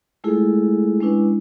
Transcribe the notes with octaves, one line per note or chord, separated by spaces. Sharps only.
G#3 A3 E4 F4 G#4 A4
G#3 C#4 D4 E4 B4